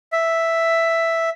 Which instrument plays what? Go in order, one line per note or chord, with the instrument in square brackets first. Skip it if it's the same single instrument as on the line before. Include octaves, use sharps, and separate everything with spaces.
[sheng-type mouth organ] E5